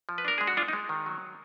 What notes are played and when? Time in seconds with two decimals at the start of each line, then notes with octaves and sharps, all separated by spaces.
0.09 F3
0.18 B4
0.25 D4 A#4
0.38 G#3 G#4
0.47 F#4
0.57 G#3 D4 F4
0.68 D#4
0.73 G#3
0.89 D#3
1.06 F#3